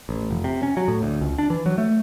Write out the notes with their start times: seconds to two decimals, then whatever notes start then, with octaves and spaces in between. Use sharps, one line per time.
0.09 A1
0.31 F1
0.44 C3
0.63 C#4
0.77 F#3
0.88 A2
1.03 D2
1.21 C#2
1.38 D4
1.50 E3
1.66 F#3
1.78 A3